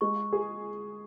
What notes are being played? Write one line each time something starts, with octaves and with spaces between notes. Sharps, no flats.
G#3 C#6
G#4